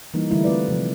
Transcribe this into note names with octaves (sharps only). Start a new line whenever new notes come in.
E3 G3 A#3 D#4
D3 E3 G3 A3 E4
A3 C4 F4 B4 D5
C3 F3